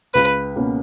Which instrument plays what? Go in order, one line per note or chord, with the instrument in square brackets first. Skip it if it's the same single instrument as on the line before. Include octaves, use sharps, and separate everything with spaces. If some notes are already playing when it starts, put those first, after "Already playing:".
[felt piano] C#2 [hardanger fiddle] B4
[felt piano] B2 A#3 C#4